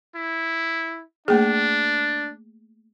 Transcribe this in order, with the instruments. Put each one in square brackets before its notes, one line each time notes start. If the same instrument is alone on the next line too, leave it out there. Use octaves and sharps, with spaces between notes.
[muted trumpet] E4
[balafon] A3 A#3 G#4 [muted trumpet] D4